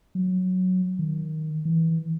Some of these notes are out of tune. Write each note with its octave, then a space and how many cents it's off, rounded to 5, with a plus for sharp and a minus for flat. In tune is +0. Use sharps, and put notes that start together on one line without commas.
F#3 -5
D#3 +5
E3 -15